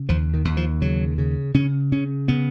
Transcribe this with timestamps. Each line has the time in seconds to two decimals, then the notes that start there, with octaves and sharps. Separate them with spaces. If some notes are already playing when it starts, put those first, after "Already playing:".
Already playing: C#3
0.09 D#2 F3
0.34 D#3
0.45 D#2
0.57 F3
0.82 C#3 F#3
1.18 C#3
1.54 C#3 C#4
1.92 C#3 C#4
2.28 C#3 B3